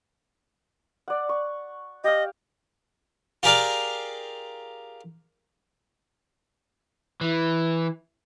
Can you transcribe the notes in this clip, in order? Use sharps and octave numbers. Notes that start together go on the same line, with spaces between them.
D5 F#5
C#6
G4 D#5 F5
F4 G4 G#4 A#4 D5 F5
E3